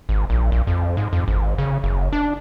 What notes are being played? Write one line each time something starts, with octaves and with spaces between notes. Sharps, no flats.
G#1
A#1
A#1
F2
G#2
F2
G#1
C#3
F#1
D4